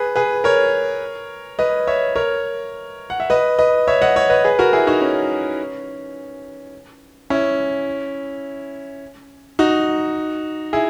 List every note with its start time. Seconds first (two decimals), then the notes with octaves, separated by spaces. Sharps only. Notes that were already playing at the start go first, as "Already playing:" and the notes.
Already playing: G#4 B4
0.16 G#4 B4
0.44 A#4 C#5
1.59 B4 D#5
1.87 C#5 E5
2.16 A#4 C#5
3.10 F#5
3.20 E5
3.30 B4 D#5
3.59 B4 D#5
3.87 C#5 E5
4.02 D#5 F#5
4.16 C#5 E5
4.30 B4 D#5
4.45 G#4 B4
4.59 F#4 A#4
4.73 E4 G#4
4.87 D#4 F#4
5.01 C#4
7.30 C#4 E4
9.59 D#4 F#4
10.73 E4 G#4